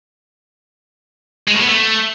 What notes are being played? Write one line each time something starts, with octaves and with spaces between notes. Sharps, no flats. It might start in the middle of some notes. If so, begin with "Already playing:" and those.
G#3
A2
B3
A3